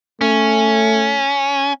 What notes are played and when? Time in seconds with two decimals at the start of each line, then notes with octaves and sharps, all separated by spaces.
0.21 A3 C#4